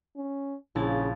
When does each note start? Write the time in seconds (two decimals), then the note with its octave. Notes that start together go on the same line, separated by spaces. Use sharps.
0.16 C#4
0.75 A#1 C#3 E4 A6